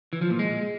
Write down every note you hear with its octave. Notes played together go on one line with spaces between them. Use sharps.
E3
F3
A#2
G#3